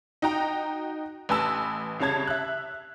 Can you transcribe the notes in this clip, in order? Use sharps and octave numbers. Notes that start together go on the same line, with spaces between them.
D#4 F#4 G5 A#5
A1 B4 G#5 A5 E6
C2 C#3 C#5 A5 G#6
E5 F#6